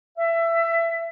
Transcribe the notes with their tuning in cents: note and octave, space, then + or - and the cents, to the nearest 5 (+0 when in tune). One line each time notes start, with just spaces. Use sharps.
E5 +20